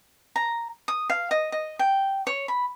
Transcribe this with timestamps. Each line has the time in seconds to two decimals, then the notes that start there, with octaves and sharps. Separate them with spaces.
0.36 A#5
0.88 D#6
1.10 F5
1.31 D#5
1.52 D#5
1.79 G5
2.27 C#5
2.48 B5